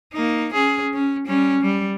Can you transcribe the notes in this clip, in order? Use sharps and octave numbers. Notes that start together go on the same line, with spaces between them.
A#3 D#4
C#4 G#4
C#4
G3 C#4
G3